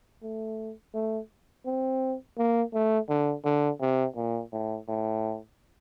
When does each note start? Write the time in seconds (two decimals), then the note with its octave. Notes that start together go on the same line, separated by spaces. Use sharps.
0.23 A3
0.94 A3
1.66 C4
2.38 A#3
2.74 A3
3.09 D3
3.45 D3
3.81 C3
4.16 A#2
4.52 A2
4.88 A2